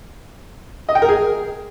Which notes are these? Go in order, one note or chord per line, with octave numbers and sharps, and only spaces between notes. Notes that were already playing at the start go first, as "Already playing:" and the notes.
D#5
G5
A#4
G#4